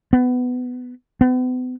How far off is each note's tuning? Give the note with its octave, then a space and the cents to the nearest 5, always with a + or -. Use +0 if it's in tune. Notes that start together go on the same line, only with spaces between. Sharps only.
B3 +15
B3 +40